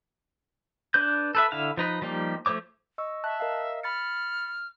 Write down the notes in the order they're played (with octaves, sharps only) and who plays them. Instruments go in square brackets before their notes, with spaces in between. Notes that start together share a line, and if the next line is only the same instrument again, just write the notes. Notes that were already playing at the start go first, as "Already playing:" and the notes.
[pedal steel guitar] D4 B4 G6
A4 B4 E5
D3 E4 F5
F3 D#4 B4
F3 G3 A#3 D#4 G4
F3 A3 C5 C#5 D6
[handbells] D#5 C#6 E6
[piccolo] E5 [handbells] A5 F#6
[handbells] A#4 D#5 F5
[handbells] B5 A6 C#7 [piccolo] F6